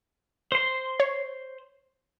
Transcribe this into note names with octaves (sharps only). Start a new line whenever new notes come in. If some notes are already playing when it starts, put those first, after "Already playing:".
C5 C6
C#5